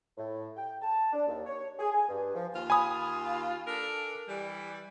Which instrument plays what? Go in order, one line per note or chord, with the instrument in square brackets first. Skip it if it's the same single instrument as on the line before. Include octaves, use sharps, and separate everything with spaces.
[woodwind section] A2
G5
A5
D4
D#2
C#5
G#4
G#5
G2
F3
[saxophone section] D#2 F4
[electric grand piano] G#5 B5 D#6
[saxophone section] D4 A4 A#4
E3 G3